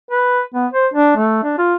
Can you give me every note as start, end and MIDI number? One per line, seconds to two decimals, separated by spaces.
0.11 0.42 71
0.54 0.66 59
0.73 0.87 72
0.94 1.12 62
1.17 1.40 57
1.44 1.58 62
1.58 1.75 65